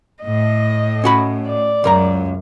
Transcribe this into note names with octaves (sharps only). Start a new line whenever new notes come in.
A2 D#5
C#4 F#4 B5
D5
C#2 F#2 A#4 A#5